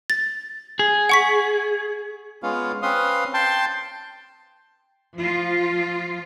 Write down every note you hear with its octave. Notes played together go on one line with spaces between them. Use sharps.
A6
G#4
F#5 C#6 B6
G#3 B3 C#4 F4 F5
C4 C#4 B4 F5 C6 D#6
G5 A5 C6
F3 F4